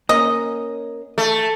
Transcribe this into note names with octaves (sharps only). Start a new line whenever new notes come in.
A#3 C#4 D#5
A3